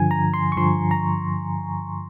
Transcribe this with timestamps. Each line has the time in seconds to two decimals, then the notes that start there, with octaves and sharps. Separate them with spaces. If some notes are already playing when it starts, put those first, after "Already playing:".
Already playing: G2 D3 F3 G#5
0.11 A#5
0.34 C6
0.52 C#6
0.57 G2 D3 F3 C6
0.91 A#5